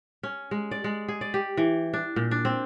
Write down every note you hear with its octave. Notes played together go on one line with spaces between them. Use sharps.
C#4
G#3
D5
G#3
G#4
D5
G4
E3
D4
A#2
D4
C4